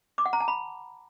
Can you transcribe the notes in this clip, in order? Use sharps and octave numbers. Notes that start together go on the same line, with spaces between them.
D6
F#5
A#5
A5
B5